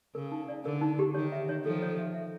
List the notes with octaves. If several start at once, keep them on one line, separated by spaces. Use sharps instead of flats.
C#3 A#4
D#4
D5
D3 A#4
D#4
G4
D#3 C#5
E5
C#5
D#3 F3 A4
C#5
E5
E5